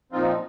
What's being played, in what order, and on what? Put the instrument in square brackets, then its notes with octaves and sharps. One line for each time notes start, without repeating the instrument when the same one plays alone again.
[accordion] A#2 F3 C4 D#4 F4